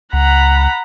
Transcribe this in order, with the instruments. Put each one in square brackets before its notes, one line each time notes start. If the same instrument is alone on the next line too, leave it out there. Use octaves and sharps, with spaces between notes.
[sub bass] C#2 [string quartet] F#5 A#5 B5